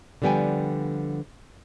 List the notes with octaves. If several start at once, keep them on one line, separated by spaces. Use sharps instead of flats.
D3 F3 G3 B3 G5 G#5